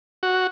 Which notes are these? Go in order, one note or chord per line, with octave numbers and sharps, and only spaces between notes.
F#4